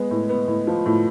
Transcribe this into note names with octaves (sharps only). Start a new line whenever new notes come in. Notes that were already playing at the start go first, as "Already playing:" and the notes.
Already playing: G#3 B3
A2
B3
A2
F3
A2